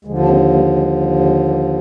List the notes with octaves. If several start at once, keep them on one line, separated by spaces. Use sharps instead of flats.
D#2 D3 F3 G#3
D4
G#3 C4
G3 A#3
G#3
G3
G3
G#3
G3 A#3